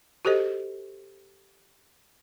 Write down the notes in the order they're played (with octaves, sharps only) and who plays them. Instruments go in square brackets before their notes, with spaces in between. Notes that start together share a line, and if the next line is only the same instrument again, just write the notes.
[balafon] F#4 G4 A4 C5 D#5